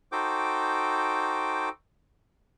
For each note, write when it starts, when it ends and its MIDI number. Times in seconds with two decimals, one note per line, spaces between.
0.12 1.69 63
0.12 1.69 66
0.12 1.69 69
0.12 1.69 72
0.12 1.69 79
0.12 1.69 86